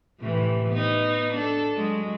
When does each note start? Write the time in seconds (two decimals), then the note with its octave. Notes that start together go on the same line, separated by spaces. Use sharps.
0.20 A2 C3 E3
0.68 B3 D#4
1.33 D4 A4
1.75 F#3 G#3